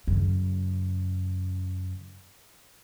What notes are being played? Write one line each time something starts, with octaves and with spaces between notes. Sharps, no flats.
F#2 C#3